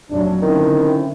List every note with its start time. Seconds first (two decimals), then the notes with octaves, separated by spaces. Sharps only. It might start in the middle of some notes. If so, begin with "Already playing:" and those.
0.11 F1 A#2 F#3 D4
0.42 D3 D#3 C4 C#4 E4